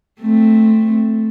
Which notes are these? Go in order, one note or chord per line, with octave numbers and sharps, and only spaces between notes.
A3 C4